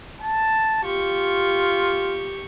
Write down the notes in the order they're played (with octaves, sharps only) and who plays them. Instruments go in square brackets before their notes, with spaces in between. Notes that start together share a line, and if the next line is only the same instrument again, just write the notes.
[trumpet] A5
[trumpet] F4 [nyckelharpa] G4 C#6